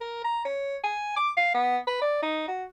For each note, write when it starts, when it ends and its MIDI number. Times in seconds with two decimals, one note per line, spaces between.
0.01 0.23 70
0.24 0.42 82
0.45 0.77 73
0.84 1.14 80
1.17 1.29 86
1.37 1.50 77
1.55 1.77 59
1.87 1.98 71
2.02 2.20 74
2.22 2.46 63
2.48 2.64 66